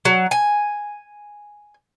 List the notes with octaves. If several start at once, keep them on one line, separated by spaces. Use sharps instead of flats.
F#3
G#5